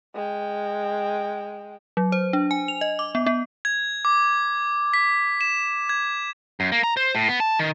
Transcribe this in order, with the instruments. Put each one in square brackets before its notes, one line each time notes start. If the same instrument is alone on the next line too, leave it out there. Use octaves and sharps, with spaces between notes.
[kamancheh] G#3 G5
[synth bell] F#3
C5
D4
G#5
F7
D#5
D6
B3
B3
[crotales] G#6
D6
B6
E7
G#6
[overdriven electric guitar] F#2
A#3
A#5
C5
A2
B3
A5
D#3